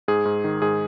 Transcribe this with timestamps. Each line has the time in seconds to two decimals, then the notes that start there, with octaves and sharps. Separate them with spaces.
0.08 G#2 G#4
0.25 G#2
0.44 D#3
0.62 G#2 G#4